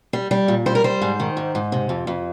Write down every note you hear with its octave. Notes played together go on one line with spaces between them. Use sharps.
G3
G3
A#2
G3 C5
A#4
G3 C5
G#2
D#3
G#2
G#2
C3
F2
F2